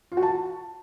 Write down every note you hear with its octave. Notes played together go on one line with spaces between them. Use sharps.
F4
F#4
A5